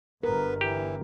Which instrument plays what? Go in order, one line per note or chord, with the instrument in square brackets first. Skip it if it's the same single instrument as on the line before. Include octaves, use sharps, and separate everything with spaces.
[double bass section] G1 [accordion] B3 B4 [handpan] A#4
[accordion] E3 [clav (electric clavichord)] G4